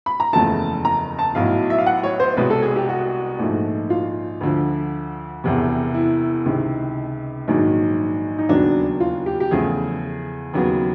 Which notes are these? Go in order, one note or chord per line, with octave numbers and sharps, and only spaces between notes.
B5
A#5
F#1 E2 C#3 F3 A3 A5
A#5
A5
B1 A2 F#3 F5
E5
F5
F#5
C#5
C5
C2 B2 G#3 B3 B4
A4
G#4
G4
F#4
A#1 G#2 F3 A3
F4
D2 D3 F3
E1 E2 C3
E4
C#2 C3 D#3
A#1 G#2 D#3 F#3
D#4
E1 D#2 C#3 F#3 D4
F4
G4
G4
E2 C#3 F3 A3 G#4
D#2 C#3 F#3 B3